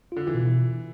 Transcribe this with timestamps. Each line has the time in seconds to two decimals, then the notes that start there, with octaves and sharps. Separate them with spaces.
0.12 D3 F4
0.27 E3
0.34 B2